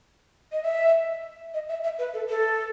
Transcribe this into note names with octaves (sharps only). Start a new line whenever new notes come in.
D#5
E5
D#5
E5
E5
B4
A4
A4